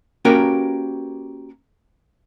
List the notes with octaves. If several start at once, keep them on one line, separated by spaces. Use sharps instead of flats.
A#3 C#4 F#4 G4 A#4 B4